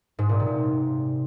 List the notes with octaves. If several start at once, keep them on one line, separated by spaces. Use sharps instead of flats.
G#2
A#2
C3